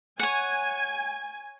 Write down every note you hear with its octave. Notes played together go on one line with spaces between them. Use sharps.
C#5 F#5 G#5